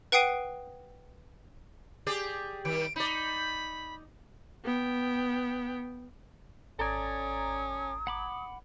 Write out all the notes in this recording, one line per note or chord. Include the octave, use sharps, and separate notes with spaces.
B4 F#5 G5 D#6 C7 D#7
G4 G#4 D5
D#3 G3 D7
D#4 D5 B5
B3 G5
G#1 C#4 A4 D5 A#5 D#6 G#6
F#5 B5 D6